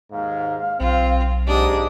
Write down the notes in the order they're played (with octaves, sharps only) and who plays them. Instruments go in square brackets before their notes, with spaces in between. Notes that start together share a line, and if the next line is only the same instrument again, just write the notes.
[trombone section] D#2 G#2 [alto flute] F5
[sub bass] B1 [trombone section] C4 [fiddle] F4
[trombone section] G#2 [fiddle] D4 D#6 [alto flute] G4